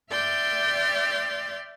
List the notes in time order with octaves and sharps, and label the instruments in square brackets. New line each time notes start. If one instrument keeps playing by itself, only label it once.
[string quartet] D5 E5 G5 C6 F6